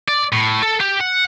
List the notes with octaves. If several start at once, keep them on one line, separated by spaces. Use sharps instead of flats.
D5
A2
A4
G4
F#5